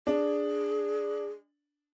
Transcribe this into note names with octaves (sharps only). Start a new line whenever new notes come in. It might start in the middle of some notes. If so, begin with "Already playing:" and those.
D4 G#4